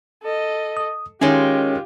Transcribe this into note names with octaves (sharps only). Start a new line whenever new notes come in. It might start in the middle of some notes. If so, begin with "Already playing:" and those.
A4 D#5
D#6
D#3 G#3 C#4 F4 G4 C#5